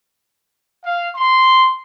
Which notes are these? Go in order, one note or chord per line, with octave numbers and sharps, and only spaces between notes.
F5
C6